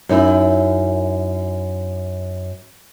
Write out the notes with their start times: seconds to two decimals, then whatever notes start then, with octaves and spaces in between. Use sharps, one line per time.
0.09 F#2 D#4 E4